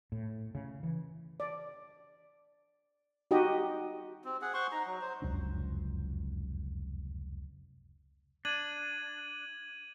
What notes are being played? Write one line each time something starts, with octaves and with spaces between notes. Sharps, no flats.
A2
C#3
E3
D5
D#4 F#4 G4 D#5
C4
G#4 F#5
C5 F#5 C6 C#6
D#4 A#5
F#3
C5
F1 C#2 F#2 D4
D4 G#6 D#7 F#7